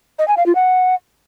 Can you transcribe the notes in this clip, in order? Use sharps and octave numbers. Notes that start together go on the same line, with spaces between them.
D#5
G#5
F5
F4
F#5